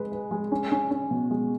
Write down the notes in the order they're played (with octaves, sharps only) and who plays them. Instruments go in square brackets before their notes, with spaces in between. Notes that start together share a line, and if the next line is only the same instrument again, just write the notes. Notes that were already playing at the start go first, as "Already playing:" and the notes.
Already playing: [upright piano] G#3 B4
B4
G#3
C#4
C#4
C#4
B2
G#3